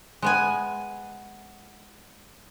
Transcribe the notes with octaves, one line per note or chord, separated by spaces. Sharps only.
G#3 B3 G#5